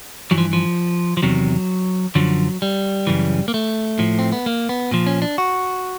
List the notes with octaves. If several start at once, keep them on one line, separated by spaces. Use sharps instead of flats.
G2 E3 F#3
F3
F3
F3
E2 C3 D#3 F#3
F#2 D3 F3 F#3
G3
F#2 C#3 E3
A#3
A3
A2 F3
C4
B3
A#3
B3
A#2 F3
C#4
D4
F#4